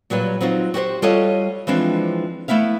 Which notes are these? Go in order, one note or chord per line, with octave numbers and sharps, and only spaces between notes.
A#2 F#3 G3 B4
F#3 C4 D#4 F4 F#4
F#4 G4 A#4 C5
G3 F4 F#4 A4 C#5 D#5
E3 F3 G#3 C4 D4
A3 B3 E4 E5 F5